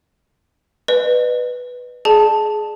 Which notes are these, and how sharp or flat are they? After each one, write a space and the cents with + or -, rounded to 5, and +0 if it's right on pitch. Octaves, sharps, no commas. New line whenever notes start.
B4 +0 D#5 -40
G#4 +20 D5 +40 A5 +0